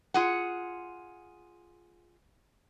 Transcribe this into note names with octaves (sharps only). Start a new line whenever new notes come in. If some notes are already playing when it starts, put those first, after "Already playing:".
F4 G#4 F#5